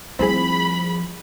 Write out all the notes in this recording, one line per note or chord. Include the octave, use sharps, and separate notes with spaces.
D#3 F3 G3 A3 C4 E4 G#4 B5